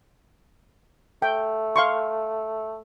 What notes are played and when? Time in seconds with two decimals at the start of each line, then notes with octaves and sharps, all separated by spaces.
1.22 A3 G5
1.76 F5 C6 C#6